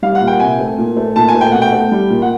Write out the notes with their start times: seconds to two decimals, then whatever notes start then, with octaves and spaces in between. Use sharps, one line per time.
0.02 G3 F5
0.15 F#5
0.21 A#2
0.27 G5
0.40 C3 G#5
0.60 A3
0.78 A#2
0.97 A3
1.16 A#2 A5
1.28 G#5
1.35 A3
1.41 G5
1.52 B2 F#5
1.62 G5
1.72 A3
1.92 G3
2.10 A#2
2.22 F#5